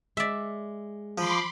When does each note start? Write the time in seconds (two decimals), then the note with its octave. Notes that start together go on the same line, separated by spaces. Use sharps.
0.17 G#3 D5 E5
1.18 F3 B5 C6 D6